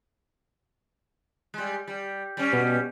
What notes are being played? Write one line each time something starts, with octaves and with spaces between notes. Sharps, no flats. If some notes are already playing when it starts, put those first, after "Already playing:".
G3 G#3
G3
G3 C#4
B2